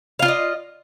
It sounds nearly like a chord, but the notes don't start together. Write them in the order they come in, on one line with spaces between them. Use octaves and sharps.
F5 F4 D5 D#5